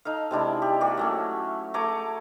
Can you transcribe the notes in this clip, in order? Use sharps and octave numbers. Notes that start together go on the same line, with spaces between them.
D#4 A4 F5
C3 G#3 D4 E4
G4
A#3 F#4 G4 D5
F#3 A3 C#4
A3 G#4 A#5 D6